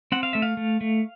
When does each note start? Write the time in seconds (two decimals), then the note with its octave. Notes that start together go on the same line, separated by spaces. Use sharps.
0.12 C4 F#5
0.23 F5
0.33 A3 E5
0.42 F5
0.57 A3
0.81 A3